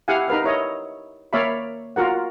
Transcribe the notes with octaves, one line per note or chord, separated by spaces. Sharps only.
E4 G4 F5 F#5 G#5
D#4 A#4 B4 F5
E4 C#5 D#5
A#3 C#5 D5 E5 F5 B5
F4 F#4 A#4 F#5